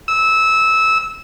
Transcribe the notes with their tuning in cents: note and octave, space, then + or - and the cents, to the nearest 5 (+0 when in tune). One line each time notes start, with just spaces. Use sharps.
E6 -20